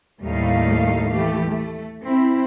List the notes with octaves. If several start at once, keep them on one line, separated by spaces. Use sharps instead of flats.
D#2 A2 G3 A3 D#4 F5
E3 A3 G4
A3
C4 E4